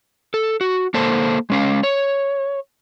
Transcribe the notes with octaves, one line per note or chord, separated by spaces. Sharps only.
A4
F#4
A#3 A4 C5 A5
G#3 C#4 F5
C#5